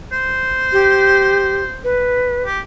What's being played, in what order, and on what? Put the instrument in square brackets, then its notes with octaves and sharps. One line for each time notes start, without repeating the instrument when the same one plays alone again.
[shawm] C5
[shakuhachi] G4
B4
[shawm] G4